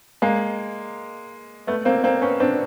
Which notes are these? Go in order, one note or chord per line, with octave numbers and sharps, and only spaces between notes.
G#3 A#3
A3 B3
A#3 C4
A#3 C4
B3 C#4
C4 D4